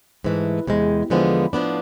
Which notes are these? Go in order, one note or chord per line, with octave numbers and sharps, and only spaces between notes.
G#2 E3 A3
E2 C3 G#3
E2 D3 F3 G#3 B3
A2 F3 B3 D4